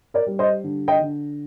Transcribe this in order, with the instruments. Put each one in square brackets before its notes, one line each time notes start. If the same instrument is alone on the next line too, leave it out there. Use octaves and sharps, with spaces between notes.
[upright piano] A#4 D5
G3
C5 D#5
D3
D#5 G5
D3